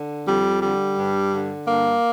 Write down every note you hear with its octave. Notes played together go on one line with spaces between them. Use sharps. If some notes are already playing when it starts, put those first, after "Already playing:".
Already playing: D3
F2 G3
D3 G3
G2
D3
G2 A#3